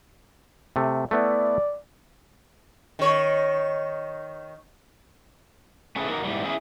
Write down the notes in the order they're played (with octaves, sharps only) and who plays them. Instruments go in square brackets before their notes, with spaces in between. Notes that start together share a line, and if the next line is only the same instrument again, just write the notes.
[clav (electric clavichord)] C3 A3
[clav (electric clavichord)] A3 B3 E4 [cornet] D5
[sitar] D#3 C#5
[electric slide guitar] A3 C#4 E4 G#4 B4
A#3 D#4 F#4 A#4
G#2 E3 G3
C#4 E4 G#4